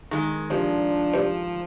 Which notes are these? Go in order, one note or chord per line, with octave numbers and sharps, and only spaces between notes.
D#3 G#3
C3 F3 D4
G2 C3